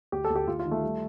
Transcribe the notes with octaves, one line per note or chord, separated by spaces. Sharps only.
D2 G4
A4
D2
G4
D2 F4
F4
D#3
A3
G3